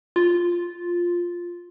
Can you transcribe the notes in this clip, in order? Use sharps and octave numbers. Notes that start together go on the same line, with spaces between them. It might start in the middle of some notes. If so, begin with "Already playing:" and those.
F4